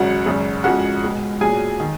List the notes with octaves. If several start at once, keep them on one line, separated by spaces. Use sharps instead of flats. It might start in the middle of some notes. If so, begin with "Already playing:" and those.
Already playing: G#1 F#2 C#3 F#3 F#4 F#5
G#1 F#2 C#3
F2 C#3 F3 G#3 F#4 F#5
C#2 B2 G#3
B1 A#2 F#3 G#4 G#5
D#3